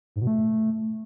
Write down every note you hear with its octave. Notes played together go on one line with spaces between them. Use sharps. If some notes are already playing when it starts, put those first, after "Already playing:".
G#2
B2
A3